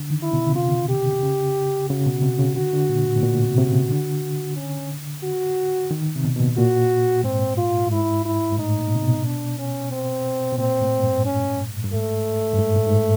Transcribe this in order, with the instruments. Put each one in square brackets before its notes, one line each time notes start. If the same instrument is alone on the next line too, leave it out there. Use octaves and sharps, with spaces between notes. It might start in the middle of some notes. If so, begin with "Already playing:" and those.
Already playing: [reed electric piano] D3
D#3
[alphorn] E4
[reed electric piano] B2
C#3
[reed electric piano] C3 [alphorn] F4
[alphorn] G4
[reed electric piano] C#3
[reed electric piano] C#3 [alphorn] F#4
[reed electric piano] B2
C3
C#3
[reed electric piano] D3 [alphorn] F#4
[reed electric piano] D3
A#2
A2
A2
A#2
C3
C3
C#3
D3
[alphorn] C#4
F#4
[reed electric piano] D#3
C3
B2
B2
A#2
[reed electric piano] A#2 [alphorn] F#4
[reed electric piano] G#2 [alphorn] C4
[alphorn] F4
[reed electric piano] A2
[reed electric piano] G#2 [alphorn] E4
[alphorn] E4
[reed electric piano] G#2
[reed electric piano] A2 [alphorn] D#4
[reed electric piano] A#2
C3
B2
[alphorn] D4
C#4
C4
[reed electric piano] B2
[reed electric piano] A#2 [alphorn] C4
[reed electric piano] A2
G2
[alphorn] C#4
[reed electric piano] G2
[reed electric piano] G#2 [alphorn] A3
[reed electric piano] G2
G#2
A2
G#2